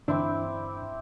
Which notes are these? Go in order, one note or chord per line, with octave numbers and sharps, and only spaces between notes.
G2 D3 E3 C4 D4 E4 D5